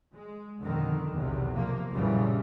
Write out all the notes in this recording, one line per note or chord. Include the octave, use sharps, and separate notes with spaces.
G#3
F2 B2 D3 D#3
B1 E2 C3
C3 F3 A#3
A#1 F#2 C#3 E3 F3 G3